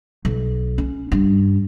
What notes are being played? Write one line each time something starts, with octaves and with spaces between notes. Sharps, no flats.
B1
C#4
G2